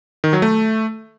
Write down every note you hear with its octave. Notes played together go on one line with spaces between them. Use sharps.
D#3
F#3
A3